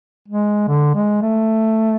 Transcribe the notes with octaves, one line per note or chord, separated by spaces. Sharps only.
G#3
D3
G#3
A3